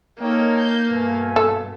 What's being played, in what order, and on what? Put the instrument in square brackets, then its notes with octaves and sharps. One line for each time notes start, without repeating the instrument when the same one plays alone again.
[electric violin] A#3 [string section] D#4 A4 G5 [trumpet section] A#4 C#5 D#5
[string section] G6
[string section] G2 B2 B3 [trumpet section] A3 F5 G#5
[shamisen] A4